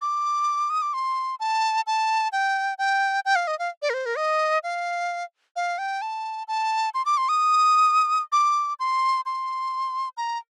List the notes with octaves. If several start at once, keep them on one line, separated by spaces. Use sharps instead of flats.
D6
D#6
D6
C6
A5
A5
G5
G5
G5
F5
D#5
F5
D5
A#4
C5
A#4
D#5
F5
F5
G5
A5
A5
C6
D6
C6
D#6
D6
C6
C6
A#5